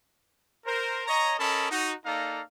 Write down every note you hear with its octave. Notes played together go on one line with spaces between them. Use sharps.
A#4 C5
C#5 D#5 A#5
C#4 A4 A#4 D#5 A5 B5
D#4 F#4
A#3 D#4 A4 D5 F5 A#5